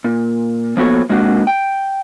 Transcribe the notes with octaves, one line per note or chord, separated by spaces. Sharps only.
A#2
F3 A#3 B3 F#4 A4 C#5
C3 G#3 A#3 D4 F#4
G5